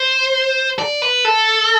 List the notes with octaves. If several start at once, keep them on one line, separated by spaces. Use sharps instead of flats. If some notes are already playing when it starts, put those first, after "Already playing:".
Already playing: C5
D5
B4
A4